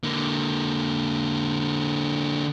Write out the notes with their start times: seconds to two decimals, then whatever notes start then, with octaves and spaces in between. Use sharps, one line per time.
0.03 D3 A#3